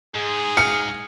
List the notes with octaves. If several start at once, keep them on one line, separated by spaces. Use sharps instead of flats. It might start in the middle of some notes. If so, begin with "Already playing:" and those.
G#2 G#4
F5 C#7